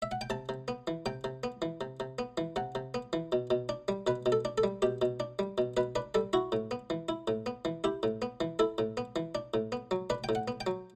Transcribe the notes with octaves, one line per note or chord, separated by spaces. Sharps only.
E5
F#5
G5
C3 A5
C3
B3
E3
C3 G5
C3
B3
E3
C3
C3
B3
E3
C3 F#5
C3
B3
E3
B2
B2
D4
G3
B2 B4
B2
A4
D4
A4
G3
B2 G4
B2
D4
G3
B2
B2 B4
D4 B4
G3 A4
E4 F#4
A2
B3
E3
E4
A2
B3
E3
E4 G4
A2
B3
E3
E4 A4
A2
B3
E3
D4
A2
B3
F#3
D4 B4
G5
A2
F#5
B3
G5
F#3